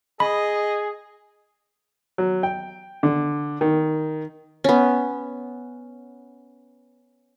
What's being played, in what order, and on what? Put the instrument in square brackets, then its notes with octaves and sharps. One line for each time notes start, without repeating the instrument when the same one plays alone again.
[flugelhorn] G#4 [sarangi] D#5 [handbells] B5
[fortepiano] F#3
G5
D3
D#3
[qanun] B3 C#4